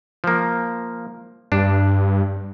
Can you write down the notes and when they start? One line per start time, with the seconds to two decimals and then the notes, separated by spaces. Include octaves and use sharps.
0.24 F3 A#3
1.52 G2 D4